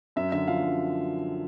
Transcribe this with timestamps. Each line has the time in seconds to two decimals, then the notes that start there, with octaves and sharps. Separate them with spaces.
0.16 F#2 E5
0.32 D3 E5
0.47 F3 F5
0.63 F#2